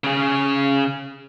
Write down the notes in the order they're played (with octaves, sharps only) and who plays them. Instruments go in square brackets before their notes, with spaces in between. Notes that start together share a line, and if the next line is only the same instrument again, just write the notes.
[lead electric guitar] C#3 G#4